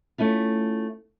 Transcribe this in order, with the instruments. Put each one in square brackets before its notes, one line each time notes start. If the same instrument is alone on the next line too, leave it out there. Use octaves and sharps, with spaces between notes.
[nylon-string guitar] A3 C#4 E4 F4